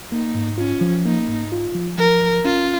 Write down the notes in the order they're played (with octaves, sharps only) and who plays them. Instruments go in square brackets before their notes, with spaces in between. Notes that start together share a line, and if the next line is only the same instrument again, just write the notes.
[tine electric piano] A#3 [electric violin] D#4
[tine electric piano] G#2
[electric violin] C#4 [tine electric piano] F4
[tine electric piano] F3
[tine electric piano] A#3 [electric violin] D#4
[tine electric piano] G#2
F4
F3
[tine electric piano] F3 [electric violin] A#4
[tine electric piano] G#1
[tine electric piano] C#4 [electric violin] F4